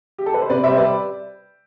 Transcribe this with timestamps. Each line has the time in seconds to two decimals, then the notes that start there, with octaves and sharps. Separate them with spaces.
0.18 G4
0.26 A4
0.34 B4
0.42 C5
0.50 C3 B4 D5
0.63 G3 C5 E5
0.77 B4 D5